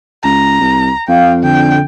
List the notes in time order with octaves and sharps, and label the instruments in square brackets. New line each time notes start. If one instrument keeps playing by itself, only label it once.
[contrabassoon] C#2 [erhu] A#5
[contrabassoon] C2
[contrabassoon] F2 [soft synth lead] F5 [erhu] G5
[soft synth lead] D3 [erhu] G5